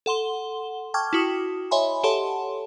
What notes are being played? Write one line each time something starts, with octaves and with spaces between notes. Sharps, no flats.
A4 F#5 C6 G7
G5 A5 C#6 D6 F6 G#6
E4 F#4 D#6
C#5 D#5 E5 G#5 B5 C6
G4 A4 C#5 F#5 A5 C6